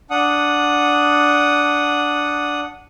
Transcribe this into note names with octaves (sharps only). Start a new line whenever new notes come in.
D4 F#5 D#6